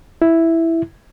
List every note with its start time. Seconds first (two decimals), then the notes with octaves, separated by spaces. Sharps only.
0.22 E4